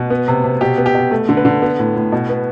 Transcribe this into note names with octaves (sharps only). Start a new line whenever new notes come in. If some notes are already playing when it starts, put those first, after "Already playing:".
Already playing: B2 B4
B3
C3
C3
B2 G4
B3
G4
B2
A3
D3
B4
D3
B3
A2
A2
B2
B3